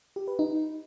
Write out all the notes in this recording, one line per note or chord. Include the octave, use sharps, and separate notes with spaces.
G4
B4
D#4